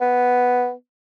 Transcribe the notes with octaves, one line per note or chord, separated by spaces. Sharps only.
B3